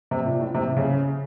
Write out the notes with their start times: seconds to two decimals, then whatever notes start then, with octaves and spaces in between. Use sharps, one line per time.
0.11 C3
0.26 A#2
0.40 A2
0.54 C3
0.77 C#3